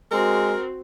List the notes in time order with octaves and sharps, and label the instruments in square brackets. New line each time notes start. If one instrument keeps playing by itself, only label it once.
[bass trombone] G#3 [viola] C4 F#4 [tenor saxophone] A#4